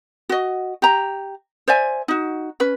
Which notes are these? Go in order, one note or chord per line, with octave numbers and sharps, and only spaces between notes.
F#4 D#5
G4 A#5
C5 D5 E5 G#5
D#4 F#4
C#4 B4